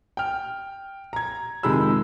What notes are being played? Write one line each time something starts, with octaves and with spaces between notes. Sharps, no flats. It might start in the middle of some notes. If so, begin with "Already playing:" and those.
G5 F6
A#5 G#6
F2 C3 D#3 G#3 B5 E6